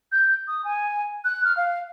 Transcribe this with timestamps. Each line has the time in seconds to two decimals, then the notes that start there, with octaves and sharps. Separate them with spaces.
0.12 G6
0.48 D#6
0.65 G#5
1.25 F#6
1.45 F6
1.57 F5